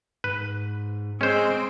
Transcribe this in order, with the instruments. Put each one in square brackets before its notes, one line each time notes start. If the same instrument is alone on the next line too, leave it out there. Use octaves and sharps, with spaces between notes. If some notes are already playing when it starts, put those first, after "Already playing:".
[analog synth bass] G#2 [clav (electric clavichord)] B4
[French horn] G#3 [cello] C4 [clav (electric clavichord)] C#4 C5